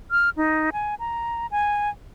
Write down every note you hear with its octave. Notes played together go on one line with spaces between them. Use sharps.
F6
D#4
G#5
A#5
G#5